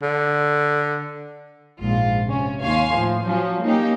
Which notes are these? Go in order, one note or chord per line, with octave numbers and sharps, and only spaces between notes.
D3
A#1 G#2 F4
C3 C#4
D#2 C#5 F5 G#5 C6
A2 F3
F3 F#3 C#4
A#3 C#4 D#4 G4